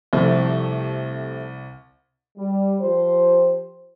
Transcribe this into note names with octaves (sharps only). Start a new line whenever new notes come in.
C2 C3 F3 A3
G3
F3 G4 C5